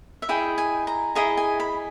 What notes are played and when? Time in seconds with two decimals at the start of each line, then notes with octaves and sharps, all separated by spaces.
0.22 E5
0.29 E4 G#4 D#5 G5
0.58 G#5
0.87 A#5
1.15 E4 G#4 D#5 A#5
1.37 G#5
1.60 B5